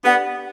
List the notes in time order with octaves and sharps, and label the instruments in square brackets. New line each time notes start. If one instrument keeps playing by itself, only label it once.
[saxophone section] B3 [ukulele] D4 G4 D5 F#5